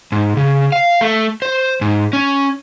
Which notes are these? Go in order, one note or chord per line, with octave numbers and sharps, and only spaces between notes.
G#2
C#3
F5
A3
C5
G#2
C#4